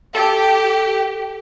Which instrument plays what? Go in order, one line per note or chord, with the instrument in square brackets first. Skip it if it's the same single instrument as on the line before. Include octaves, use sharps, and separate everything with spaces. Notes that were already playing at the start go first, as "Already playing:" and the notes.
[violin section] G4 [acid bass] A4